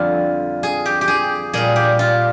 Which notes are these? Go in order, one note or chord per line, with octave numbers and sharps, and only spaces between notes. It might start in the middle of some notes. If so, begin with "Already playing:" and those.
Already playing: F2 D3 G3 F4
G#4
G4
G4
G#4
A#2 G3 G#4
G4
F4